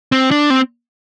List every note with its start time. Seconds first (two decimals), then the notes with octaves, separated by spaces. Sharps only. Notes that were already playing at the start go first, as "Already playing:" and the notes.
0.12 C4
0.31 D4
0.50 C4